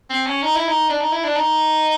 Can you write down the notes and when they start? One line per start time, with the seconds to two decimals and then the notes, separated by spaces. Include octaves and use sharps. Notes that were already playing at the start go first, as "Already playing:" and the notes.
0.10 C4
0.26 C#4
0.42 D#4
0.55 E4
0.68 D#4
0.89 D4
1.01 D#4
1.12 E4
1.24 D4
1.37 D#4